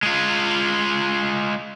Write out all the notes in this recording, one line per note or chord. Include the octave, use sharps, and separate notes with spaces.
G#3 F4